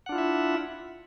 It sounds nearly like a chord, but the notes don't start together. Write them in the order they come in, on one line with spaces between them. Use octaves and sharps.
F#5 D4 F4 E4 E5